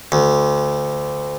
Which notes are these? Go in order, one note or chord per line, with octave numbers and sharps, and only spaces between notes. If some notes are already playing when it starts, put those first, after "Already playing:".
D2